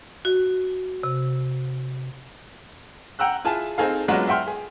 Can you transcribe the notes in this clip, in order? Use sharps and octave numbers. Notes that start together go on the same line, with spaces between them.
F#4
C3
F#5 G5 A#5 E6 F#6
E4 F4 G#4 A5
C4 D#4 G#4 A4 F5
F#3 G#3 B3 D4 F4 F#4
E5 F#5 G5 C6 F6
G#4